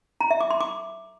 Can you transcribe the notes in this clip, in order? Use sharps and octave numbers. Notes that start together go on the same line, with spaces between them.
A#5
E5
D6
C6
D6